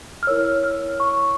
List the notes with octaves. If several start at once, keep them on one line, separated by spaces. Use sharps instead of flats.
F6
E4 A#4 C#5 E6
F6
C#6